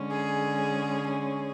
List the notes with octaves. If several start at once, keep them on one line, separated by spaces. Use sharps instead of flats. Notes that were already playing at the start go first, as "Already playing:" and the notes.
Already playing: D3 G#3 C#4
G#4
G#4